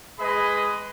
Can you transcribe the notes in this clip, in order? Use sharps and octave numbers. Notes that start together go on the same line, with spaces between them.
G#3 G#4 B4 D#5 B5